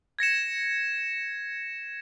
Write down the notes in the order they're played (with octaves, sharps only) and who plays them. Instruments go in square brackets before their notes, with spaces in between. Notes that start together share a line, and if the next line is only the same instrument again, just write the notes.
[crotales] G#6 A#6 C#7 E7